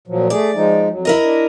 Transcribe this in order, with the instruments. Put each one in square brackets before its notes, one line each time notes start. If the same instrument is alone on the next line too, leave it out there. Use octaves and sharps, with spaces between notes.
[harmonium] A#2 F3 F#3
[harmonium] A3 G#4 [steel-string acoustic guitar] D5
[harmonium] F3 G#3 D#4
F2 F#3
[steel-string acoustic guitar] E4 A#4 D#5
[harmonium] D4